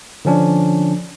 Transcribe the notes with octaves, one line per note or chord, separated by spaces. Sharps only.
D3 F3 C#4 D4